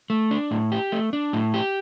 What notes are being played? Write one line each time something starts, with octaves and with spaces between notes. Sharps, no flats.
A3
D4
A2
G4
A3
D4
A2
G4